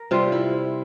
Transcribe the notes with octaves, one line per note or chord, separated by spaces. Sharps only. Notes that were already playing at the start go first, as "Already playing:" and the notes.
Already playing: A#4
C3 G3 F4
E4